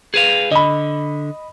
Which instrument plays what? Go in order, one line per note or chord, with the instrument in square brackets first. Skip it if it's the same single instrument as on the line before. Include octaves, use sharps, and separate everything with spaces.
[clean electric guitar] G#4 B4 F5
[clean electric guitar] D3 [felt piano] D#5 B5